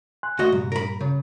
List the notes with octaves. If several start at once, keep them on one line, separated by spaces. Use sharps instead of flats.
G#5 C6 F#6
D2 F#4 D#5
C2 G2 A#2 G3
A#4 B5
C#3